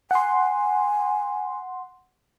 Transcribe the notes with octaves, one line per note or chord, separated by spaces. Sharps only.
F#5 G#5 C6